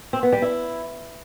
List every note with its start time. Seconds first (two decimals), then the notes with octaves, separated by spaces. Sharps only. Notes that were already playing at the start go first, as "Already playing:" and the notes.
0.13 C4
0.23 B3
0.32 G3
0.42 E4